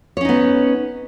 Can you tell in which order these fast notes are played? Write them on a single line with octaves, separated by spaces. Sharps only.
C#5 C#4 D#4 B3